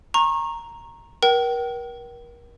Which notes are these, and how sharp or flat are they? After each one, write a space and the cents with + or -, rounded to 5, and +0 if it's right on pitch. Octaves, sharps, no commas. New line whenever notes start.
A#5 +0 C#6 -30
A#4 +35 G5 -35